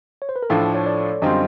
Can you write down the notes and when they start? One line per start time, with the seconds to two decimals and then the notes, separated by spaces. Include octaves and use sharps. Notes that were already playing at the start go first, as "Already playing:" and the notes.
0.22 C#5
0.29 C5
0.36 B4
0.43 A#4
0.50 A2 F3 A3 D4 A4
0.62 A4
0.75 C#5
0.86 D5
1.22 F#2 D3 G3 C4 F4 D#5